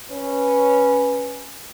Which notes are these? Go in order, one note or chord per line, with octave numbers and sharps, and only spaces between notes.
C#4 B4